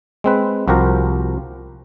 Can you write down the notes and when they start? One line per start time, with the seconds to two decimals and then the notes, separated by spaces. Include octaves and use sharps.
0.24 G#3 C4 B4
0.68 C2 F3 F#4 G4 A#4 C5